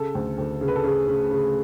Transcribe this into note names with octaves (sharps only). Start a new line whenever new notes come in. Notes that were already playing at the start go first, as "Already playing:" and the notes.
Already playing: C#3 A4
D2
D2
C#3
B4
A4
C#3 G#4
C#3
C#3